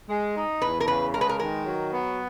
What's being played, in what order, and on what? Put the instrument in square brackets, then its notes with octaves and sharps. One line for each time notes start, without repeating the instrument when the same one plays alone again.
[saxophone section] G#3
D#4
[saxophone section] E2 [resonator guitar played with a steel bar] B4
[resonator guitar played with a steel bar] A#4
[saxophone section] C#3 [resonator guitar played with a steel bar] B4
[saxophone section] G#3 [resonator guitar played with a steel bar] A#4
[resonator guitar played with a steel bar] B4
A#4
[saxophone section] D#3 [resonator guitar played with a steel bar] A#4
[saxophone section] F#3
B3